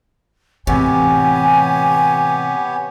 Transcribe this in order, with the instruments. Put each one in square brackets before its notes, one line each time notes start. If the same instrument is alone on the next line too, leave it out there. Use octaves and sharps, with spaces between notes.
[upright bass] A2 E3 [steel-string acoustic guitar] C3 [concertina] B3 G4 C#5 [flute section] G#5